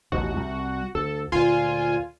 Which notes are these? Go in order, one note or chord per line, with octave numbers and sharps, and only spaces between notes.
A1 D#2 B2 F#4
C2
D2 A4
D2 A#2 F4 G#5